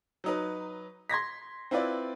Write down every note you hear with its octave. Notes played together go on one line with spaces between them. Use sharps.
F#3 D#4 B4
C6 G#6 A#6 B6
C4 E4 F4 B4 D5